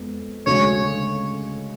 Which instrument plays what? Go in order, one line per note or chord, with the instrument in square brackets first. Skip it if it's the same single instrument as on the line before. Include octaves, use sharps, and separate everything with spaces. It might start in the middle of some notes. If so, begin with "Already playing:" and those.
Already playing: [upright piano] F2 G#3 B3
[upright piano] D2 C#3 G#3 [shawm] C#5